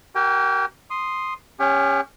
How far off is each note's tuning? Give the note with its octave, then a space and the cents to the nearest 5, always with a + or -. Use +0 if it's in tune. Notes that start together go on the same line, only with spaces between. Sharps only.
G4 -40 A#4 +0 G5 +30
C6 +0 D#6 -5
C#4 +0 G4 +40 F#5 +45